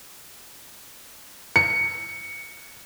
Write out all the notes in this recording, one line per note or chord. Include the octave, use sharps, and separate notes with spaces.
C#7